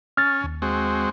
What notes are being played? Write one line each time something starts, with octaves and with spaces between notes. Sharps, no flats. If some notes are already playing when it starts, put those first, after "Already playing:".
C#4 F6 A6
D#2
G#3 C4 F#4